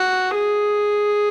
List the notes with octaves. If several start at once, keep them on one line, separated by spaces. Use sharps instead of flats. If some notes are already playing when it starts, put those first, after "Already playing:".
Already playing: F#4
G#4